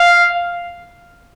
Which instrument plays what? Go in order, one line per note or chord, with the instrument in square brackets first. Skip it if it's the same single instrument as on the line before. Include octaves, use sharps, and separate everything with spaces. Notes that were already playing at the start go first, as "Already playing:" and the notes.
Already playing: [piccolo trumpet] F5